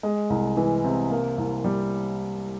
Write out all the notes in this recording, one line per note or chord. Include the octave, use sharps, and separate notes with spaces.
G#3
C2
E3
C3
A#3
C2
G3